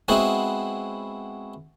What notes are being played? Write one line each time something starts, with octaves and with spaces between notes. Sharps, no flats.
G#3 B3 C4 E4 F#4